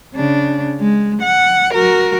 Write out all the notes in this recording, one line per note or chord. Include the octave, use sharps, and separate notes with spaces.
C#3 D4
G#3
F#5
F#4 A#4